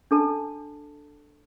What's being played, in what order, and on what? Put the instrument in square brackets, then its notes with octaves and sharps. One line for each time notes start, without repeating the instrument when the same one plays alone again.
[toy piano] D4 A4 A5